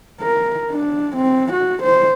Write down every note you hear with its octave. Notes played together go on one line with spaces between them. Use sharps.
A#4
D4
C4
F#4
C5